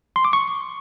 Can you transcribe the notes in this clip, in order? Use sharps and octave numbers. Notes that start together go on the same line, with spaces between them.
C6
D6
C#6